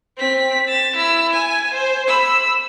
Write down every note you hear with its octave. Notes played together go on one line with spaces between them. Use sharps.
C4 B6
A6 E7
E4 E6
G#5
C5
B5 E6